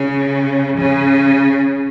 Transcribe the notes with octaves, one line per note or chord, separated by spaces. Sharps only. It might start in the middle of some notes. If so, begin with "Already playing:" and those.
Already playing: C#3
C#3